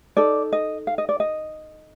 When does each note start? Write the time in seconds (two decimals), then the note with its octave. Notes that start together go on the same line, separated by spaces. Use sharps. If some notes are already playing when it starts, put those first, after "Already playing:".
0.17 D#4 A4 D5
0.52 D#5
0.87 F5
0.98 D#5
1.09 D5
1.20 D#5